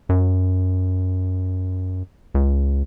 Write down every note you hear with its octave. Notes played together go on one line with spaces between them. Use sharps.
F#2
C#2